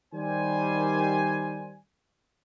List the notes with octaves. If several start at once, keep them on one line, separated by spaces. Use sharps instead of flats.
D#3 G3 C5 G#5